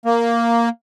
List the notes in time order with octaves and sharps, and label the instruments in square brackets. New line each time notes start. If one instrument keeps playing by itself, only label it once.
[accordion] A#3